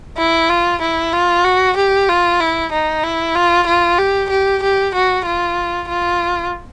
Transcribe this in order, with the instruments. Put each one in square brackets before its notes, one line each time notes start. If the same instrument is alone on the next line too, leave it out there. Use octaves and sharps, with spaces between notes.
[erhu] E4
F4
E4
F4
F#4
G4
F4
E4
D#4
E4
F4
F4
G4
G4
G4
F#4
F4
F4